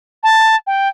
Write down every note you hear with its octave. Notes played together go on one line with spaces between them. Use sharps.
A5
G5